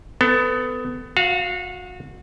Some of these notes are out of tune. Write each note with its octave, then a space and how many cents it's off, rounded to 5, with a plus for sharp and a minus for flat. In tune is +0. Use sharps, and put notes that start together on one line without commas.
B3 +25 A4 +25
F#4 -30 F5 +0